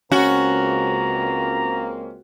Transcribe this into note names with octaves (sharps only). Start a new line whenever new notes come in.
C#2 A#3 C4 C#4 F#4 A#5